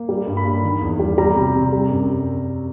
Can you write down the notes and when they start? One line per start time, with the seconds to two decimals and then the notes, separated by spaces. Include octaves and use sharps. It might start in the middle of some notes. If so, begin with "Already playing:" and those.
Already playing: A#3
0.09 G3
0.27 G2
0.37 B5
0.45 A#3
0.63 D#3
0.81 E2
0.99 G3
1.18 G3 A#5
1.36 C3
1.55 C3
1.73 G3
1.90 F#2